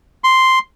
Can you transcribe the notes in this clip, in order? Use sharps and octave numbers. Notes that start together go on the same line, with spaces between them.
C6